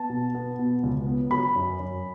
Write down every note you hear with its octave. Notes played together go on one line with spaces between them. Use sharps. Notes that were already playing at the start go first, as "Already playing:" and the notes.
Already playing: B3 A5
B2
B3
B2
C#2
B3
F#3 B5
F#2
F#2